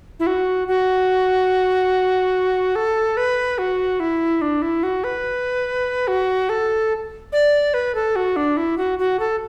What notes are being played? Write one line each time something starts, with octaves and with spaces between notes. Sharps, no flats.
E4
F#4
F#4
A4
B4
F#4
E4
D4
E4
F#4
B4
F#4
A4
D5
B4
A4
F#4
D4
E4
F#4
F#4
A4